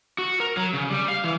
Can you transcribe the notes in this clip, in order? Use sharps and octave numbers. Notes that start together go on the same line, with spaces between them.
F#4
A#4
F#3
C#3
G3
F5
E3